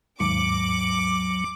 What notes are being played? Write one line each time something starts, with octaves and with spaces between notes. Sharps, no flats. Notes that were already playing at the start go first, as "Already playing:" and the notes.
D#2 G#2 F#3 D6